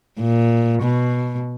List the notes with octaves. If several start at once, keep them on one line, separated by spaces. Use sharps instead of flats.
A#2
B2